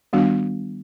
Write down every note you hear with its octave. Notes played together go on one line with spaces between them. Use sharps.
D#3 G3 B3 D4 F#4